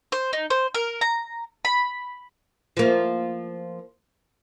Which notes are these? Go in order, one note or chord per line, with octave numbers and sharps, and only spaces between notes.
C5
D#4
C5
A#4
A#5
B5
F3 A#3